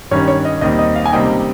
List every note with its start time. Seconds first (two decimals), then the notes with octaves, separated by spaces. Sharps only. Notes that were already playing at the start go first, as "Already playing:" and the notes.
0.11 G2 D#3 G3 C#4 C#5
0.28 C#5
0.45 D#5
0.61 D#2 D#3 G3 C4 D#5
0.79 D#5
0.95 F5
1.06 G#5
1.12 C#2 C3 G3 A#3 D#4 G5